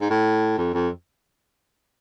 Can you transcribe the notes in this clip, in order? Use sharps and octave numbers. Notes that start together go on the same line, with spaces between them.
G#2
A2
F2
F2